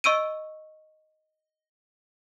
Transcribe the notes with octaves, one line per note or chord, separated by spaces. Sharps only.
D#5 C#6 E6 D7 D#7